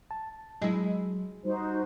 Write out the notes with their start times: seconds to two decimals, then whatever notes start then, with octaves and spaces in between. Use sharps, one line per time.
0.11 A5
0.62 F#3 G#3 E4
1.45 G3 D#4 F#4 C5